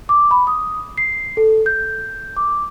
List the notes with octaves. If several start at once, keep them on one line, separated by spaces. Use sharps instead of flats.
D6
B5
D#6
C7
A4
G6
D6